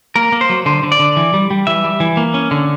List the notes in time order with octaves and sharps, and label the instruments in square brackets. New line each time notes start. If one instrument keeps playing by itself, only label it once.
[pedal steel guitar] A#3 A#4
A#3
C5
F#3
D3 C5
D3
D5
D3
E3
G3
G3
E3 E5
G3
E3
A#3
C#4
D3